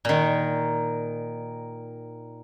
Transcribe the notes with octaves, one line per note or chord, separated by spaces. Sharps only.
A#2 D#3